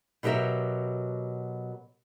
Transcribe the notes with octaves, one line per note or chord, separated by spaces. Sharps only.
B2 F#3 G4 A#4 E5